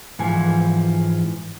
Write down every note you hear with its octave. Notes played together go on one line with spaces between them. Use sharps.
G#2 E3 F3 G#5